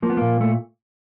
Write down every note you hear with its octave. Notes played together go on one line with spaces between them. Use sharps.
F3 A#3
B3
A#2 A#3
A3